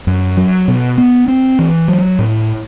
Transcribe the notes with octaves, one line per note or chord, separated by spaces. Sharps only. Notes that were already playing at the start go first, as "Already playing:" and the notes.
F#2
F#3
B2
B3
C4
E3
F#3
A2